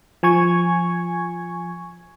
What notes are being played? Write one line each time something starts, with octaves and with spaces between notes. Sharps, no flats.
F3 G#5 C#6 G#6